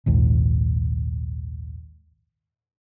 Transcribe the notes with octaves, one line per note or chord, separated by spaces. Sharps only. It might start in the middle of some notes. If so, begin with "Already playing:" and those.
A#1 D#2 G#2